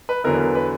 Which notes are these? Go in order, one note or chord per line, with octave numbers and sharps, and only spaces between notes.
B4
E2 D3 F#3 B3 E4 A#4
B4
A#4
B4